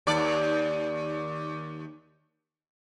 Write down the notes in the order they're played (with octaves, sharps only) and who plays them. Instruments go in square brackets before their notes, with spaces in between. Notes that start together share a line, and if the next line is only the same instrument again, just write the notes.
[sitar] D#2 D5